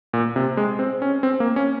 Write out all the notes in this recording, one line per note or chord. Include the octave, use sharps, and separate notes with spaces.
A#2
C3
G#3
C4
C#4
C4
A#3
C#4